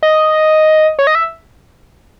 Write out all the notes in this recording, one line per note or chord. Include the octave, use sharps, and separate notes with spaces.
D#5
C#5
D#5
E5